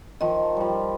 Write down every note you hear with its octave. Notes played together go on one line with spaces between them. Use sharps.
D#3 F3 D#5
F3 G3